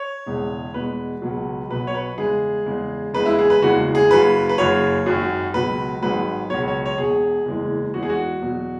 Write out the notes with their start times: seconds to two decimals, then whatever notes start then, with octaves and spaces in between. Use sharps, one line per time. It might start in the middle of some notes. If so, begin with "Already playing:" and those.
Already playing: C#5
0.26 E1 E2 C#3 G#3
0.74 E2 B2 G#3 B4
1.22 C#2 B2 F#3
1.70 B1 B2 F#3 B4
1.87 C#5
1.95 B4
2.18 E2 C#3 G#3 G#4
2.66 E2 C#3 G#3
3.14 F#1 E2 C#3 G#3 B4
3.26 E4
3.39 G#4
3.50 B4
3.62 F#1 E2 C#3 E3 G#3 F#4
3.95 G#4
4.10 F#1 F#2 C#3 F#3 B4
4.49 B4
4.58 F#1 F#2 C#3 F#3 C#5
5.06 G#1 F#2 F#3
5.54 C#2 B2 F#3 B4
6.02 G#1 G#2 F#3 B4
6.50 C#2 B2 F#3 C#5
6.68 C#5
6.86 C#5
6.98 E1 E2 B2 G#4
7.45 F#1 E2 E3 G#3
7.94 E2 E3 G#3 F#4
8.03 G#4
8.10 F#4
8.41 E2 B2 F#3